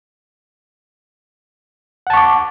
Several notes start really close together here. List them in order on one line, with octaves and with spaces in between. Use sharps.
F#5 A5 C#6 D6